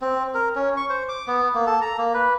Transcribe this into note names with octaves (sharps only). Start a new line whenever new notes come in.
C4
A#4
C#4
C#6
C5
D6
B3
A#3
A4
A#5
A#3
B4